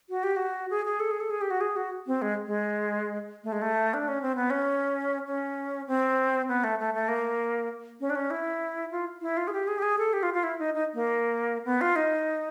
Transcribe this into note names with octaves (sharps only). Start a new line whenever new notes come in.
F#4
G4
F#4
G#4
G#4
A4
G#4
A4
G#4
G4
F#4
G#4
F#4
C4
G#3
G#3
A3
G#3
A3
D4
C#4
C4
B3
C#4
C#4
C4
B3
A3
A3
A3
A#3
C#4
D4
C#4
E4
F4
E4
F4
G#4
G4
G#4
G4
G#4
A4
G4
F4
F4
E4
D#4
D#4
A#3
B3
F4
D#4